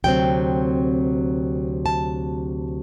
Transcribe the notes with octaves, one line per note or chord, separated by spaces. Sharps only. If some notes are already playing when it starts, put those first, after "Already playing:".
D2 C3 F#3 C4 G5
A5